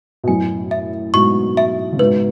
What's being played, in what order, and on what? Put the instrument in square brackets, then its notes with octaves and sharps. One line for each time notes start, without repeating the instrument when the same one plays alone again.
[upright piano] B2
[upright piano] F#2 A2 [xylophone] G#5
[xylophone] E5
[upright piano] G#2 B2 [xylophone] C#6
[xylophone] E5
[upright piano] C#3
[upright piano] G#2 B2 [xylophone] B4